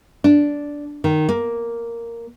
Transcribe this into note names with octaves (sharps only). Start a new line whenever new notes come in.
D4
D#3
A#3